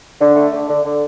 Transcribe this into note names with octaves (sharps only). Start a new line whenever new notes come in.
D3
A3
D3
D3
D3